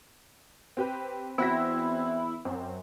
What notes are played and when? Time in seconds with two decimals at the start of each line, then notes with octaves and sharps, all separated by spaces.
0.77 C4 G4 B4
1.38 E2 C4 E4 F#4 A#6
2.45 F#2 C4